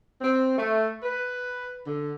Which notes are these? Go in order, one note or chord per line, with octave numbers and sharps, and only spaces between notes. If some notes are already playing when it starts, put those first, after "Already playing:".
C4
A3
B4
D3